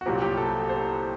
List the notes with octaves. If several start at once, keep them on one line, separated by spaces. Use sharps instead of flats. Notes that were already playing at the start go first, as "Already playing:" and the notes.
F#4
C2 A#2 F#3 C4 G4
G4
A4
C5